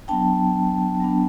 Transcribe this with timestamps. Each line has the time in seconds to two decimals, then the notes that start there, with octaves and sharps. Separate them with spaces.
0.08 F#3 B3 D4 G5 A5
1.00 F#3 B3 D4